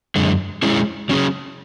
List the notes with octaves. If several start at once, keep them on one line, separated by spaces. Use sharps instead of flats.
F#2 D3 G#3
G#3 C#4 E4 G#4
F#3 C#4 G#4